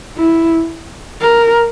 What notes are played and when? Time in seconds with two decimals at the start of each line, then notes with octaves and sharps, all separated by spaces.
0.17 E4
1.21 A#4